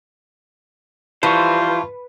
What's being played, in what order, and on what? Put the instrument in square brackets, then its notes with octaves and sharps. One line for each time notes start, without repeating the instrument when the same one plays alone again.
[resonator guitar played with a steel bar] E3 [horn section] F3 G3 F4 [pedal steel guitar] C5 [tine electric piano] A5 C#6